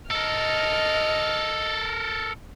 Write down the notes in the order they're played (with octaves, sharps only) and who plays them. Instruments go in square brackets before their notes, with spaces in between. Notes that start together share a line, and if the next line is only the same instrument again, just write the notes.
[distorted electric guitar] A4 A#4 [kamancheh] D#5 F6